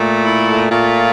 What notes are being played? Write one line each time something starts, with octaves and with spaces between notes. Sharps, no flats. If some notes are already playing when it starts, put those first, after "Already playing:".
Already playing: A#2 A3
E4
A#2 A3 F4